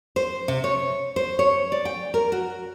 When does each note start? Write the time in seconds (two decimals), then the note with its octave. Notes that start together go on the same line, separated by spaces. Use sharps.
0.16 C5
0.48 C3
0.64 C#5
1.16 C5
1.39 C#5
1.72 D5
1.85 G5
2.14 A#4
2.32 F#4